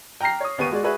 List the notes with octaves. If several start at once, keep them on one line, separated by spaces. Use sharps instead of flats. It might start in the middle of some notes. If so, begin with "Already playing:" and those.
G5 A#5 F6 A#6 C7
C#5 D#6
D#2 B3 G4 C#6 D#7
G#3 F#4 G#4 D5
F#4 G#4 B4 E5